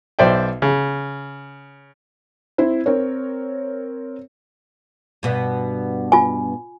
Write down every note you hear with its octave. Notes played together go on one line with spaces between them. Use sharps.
B1 C5 D5 E5 G5
C#3
C4 E4 C5
C4 A#4 C#5
G2 B2 B3
F4 G#5